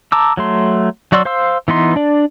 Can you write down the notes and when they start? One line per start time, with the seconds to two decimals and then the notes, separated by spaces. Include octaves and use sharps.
0.12 A5 A#5 D6 E6
0.37 F#3 A3 C6
1.12 F#3 F#4 D5 C6 E6
1.25 C5 F5 C6 E6
1.68 E3 B3 D#4 C6
1.96 D4 D5